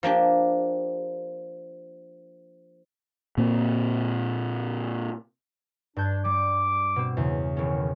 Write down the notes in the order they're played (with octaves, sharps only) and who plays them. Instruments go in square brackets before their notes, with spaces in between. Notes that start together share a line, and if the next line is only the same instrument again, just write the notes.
[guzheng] F3 A#3 D4 G4
[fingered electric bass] A#2 A#3 C4
[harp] G2 G6 G#6 [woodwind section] D4
[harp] G3 [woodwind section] D6
[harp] B2 C4
E2 C#3
[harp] E1 C#4 [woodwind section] D#3